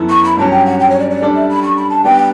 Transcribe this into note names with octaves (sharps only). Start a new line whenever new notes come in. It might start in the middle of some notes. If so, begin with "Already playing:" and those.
Already playing: F#2 E3 B3 E4 A4
C#6
B5
G2 F#3 C#4 A5
G5
F#5
G5
C#5
D5
D5
G3 D4 A4 D5
E5
B5
C#6
B5
A5
G3 B3 D4 G5